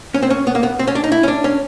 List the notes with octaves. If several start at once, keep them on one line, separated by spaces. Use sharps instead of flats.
C#4
C4
C#4
B3
A#3
B3
C4
C#4
D4
D#4
E4
C#4
D4
C#4